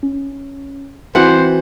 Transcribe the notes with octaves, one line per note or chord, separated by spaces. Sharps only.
C#4
E3 C4 F#4 C5 F#5 G5